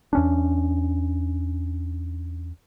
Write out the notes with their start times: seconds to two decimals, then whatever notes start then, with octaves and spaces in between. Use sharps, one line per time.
0.13 E2 C#4 D4